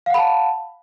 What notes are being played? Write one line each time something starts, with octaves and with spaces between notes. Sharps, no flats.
F5 F#5 A5 B5